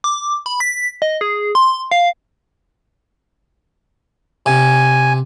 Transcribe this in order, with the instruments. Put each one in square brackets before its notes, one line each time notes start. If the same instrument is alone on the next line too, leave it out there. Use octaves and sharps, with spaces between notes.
[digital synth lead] D6
B5
B6
D#5
G#4
C6
F5
[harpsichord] C3 [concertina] G#5